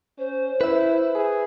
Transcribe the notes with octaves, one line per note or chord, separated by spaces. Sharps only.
C#4 C5
E4 B4 E5
G#4